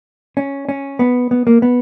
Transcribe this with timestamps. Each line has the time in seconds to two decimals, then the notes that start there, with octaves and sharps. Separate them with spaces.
0.37 C#4
0.69 C#4
0.99 B3
1.31 B3
1.47 A#3
1.62 B3